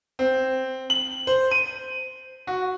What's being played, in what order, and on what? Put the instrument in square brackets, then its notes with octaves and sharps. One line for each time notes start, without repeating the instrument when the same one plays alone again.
[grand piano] C4
F#7
C5
D#7
F#4